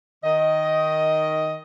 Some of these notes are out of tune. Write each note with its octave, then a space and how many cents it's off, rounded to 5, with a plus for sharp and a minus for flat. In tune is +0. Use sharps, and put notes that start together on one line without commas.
D#3 +0 D#5 +10